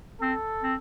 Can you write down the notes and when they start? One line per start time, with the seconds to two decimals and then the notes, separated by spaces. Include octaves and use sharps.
0.21 C4 A4
0.63 C4